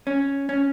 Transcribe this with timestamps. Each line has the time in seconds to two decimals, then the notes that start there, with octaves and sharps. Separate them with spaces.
0.07 C#4
0.49 C#4